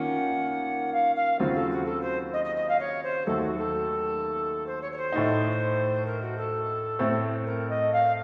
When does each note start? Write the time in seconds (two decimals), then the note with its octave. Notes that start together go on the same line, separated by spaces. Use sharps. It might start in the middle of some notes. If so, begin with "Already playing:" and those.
Already playing: D#3 A#3 C#4 F4 F#5
0.93 F5
1.16 F5
1.39 D#2 C#3 F#3 C4 F4 F#4
1.55 A4
1.70 F#4
1.86 A4
2.01 C5
2.33 D#5
2.44 D#5
2.56 D#5
2.68 F5
2.79 C#5
3.03 C5
3.26 D#2 D#3 F#3 A3 A4
3.42 F#4
3.57 A4
4.66 C5
4.81 C#5
4.92 C#5
4.97 C5
5.12 A2 A3 D#4
6.06 A#4
6.22 F#4
6.37 A4
6.99 A2 A3 C4
7.46 A#4
7.69 D#5
7.92 F5